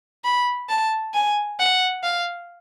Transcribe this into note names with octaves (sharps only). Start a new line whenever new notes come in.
B5
A5
G#5
F#5
F5